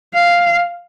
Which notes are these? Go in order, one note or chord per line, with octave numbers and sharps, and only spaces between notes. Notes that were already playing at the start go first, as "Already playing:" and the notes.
F5